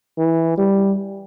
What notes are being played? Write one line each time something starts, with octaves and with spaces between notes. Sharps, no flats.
E3
G3